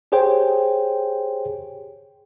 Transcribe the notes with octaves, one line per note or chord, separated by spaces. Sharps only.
G4 G#4 C5 C#5 G5